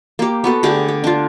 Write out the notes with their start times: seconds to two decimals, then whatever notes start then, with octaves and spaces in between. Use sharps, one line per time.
0.19 A#3 G4
0.44 B3 F#4 A4
0.63 D3 A3 G4 G#4
0.88 G4
1.04 D4 F4